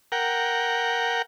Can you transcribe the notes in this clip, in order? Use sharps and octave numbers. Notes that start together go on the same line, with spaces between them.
A#4 F#5 G5